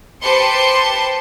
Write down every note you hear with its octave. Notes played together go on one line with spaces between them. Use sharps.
G4 B4 C5 A5 C6 C#7